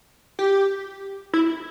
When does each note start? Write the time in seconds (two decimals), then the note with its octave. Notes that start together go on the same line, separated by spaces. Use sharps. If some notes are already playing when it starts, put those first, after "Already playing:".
0.39 G4
1.33 E4